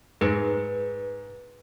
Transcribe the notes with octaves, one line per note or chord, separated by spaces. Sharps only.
G#2 G#4 B4